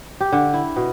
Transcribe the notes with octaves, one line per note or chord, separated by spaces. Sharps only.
G4
D3
E4
B2